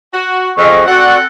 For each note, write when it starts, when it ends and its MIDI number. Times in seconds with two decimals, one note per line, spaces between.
0.13 0.51 66
0.57 0.83 41
0.57 0.84 68
0.57 0.84 75
0.57 0.84 85
0.86 1.24 60
0.86 1.16 66
0.86 1.24 69
0.86 1.16 74
0.86 1.24 78